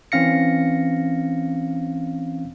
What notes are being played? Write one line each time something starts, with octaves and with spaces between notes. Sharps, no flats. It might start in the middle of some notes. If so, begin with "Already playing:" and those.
E3 C4 C#4 F5 A#6 C#7